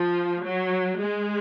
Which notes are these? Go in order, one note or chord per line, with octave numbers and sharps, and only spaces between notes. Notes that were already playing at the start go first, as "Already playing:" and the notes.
Already playing: F3
F#3
G#3